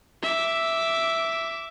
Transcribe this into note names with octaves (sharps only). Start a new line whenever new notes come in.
E5 D6